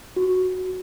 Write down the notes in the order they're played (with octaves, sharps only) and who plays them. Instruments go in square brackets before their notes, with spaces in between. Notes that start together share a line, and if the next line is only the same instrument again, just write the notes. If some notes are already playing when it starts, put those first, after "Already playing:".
[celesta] F#4